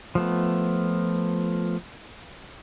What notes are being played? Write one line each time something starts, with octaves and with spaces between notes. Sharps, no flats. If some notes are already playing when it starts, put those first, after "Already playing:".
F3 A3 B3